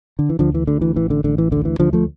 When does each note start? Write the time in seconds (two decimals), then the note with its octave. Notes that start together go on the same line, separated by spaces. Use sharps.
0.19 D3
0.29 E3
0.39 D2 D3 F3
0.54 E3
0.67 D2 D3
0.81 E3
0.96 A1 E3
1.10 D3
1.24 A1 D3
1.38 E3
1.52 D2 D3
1.65 E3
1.79 D2 D3 F3
1.93 F3 A3